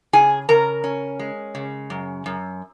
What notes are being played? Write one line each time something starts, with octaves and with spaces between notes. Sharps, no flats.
C#3 G#4 G#5
C#3 A#4 A#5
C#4
G#3
C#3
F#2
F#2